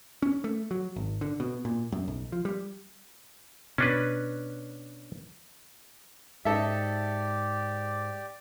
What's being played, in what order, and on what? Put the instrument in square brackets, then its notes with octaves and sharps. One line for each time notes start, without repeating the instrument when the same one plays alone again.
[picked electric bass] C#4
A3
F#3
G#1
D3
B2
A#2
F#2
B1
F3
G3
[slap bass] B2 [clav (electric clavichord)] C#4 D4 B4
[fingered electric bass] G#2 [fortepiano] D#4 A4 E5 [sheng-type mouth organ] G4 D5